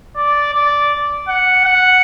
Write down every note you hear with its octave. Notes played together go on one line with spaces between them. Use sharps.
D5
D5
F#5
F#5